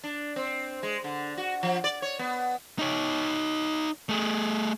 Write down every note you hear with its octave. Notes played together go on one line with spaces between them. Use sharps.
D4
C4
G#3
D3
F#4
F3
D5
C#5
B3
D#4 C#5
A3 G#4